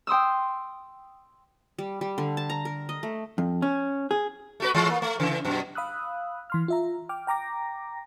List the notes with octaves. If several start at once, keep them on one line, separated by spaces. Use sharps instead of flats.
G5 C6 D#6 E6
G3
G3
D3
A5
A#5
A#4
D#5
A3
F2
C#4
G#4
A3 F#4 B4
A2 E3 G#3
A#3
A3
C#3 E3
F#2 B2
F5 B5 D#6 E6 F#6
E3 C6 F6
F4 E5 A#5
G5 D6 F6
G5 A#5 D6 A#6